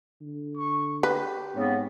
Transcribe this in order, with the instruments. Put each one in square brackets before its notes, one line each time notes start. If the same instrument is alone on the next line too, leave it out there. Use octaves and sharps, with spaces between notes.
[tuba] D3
[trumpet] C#6
[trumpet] G4 [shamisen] B4
[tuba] G#2 [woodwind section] C#3 B3 C4